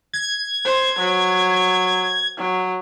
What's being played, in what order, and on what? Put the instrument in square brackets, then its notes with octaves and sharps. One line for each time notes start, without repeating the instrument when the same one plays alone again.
[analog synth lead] G#6
[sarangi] C5
F#3
F#3